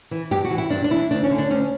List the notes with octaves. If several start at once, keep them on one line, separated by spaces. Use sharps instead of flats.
E3
G2 G4
F#4
E3
E4
G2 D4
D4
E3 E4
D2 D4
C#4
D3
D4
D2 C#4